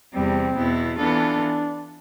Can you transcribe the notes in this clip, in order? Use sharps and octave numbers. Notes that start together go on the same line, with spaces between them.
E2 C3 G3 C4
E2 B2 B3 E4
E3 B3 D4 F4 A4